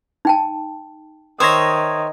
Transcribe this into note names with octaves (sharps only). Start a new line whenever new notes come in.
D#4 G5 A5
D#3 C5 C#5 E5 D#6 G#6 A#6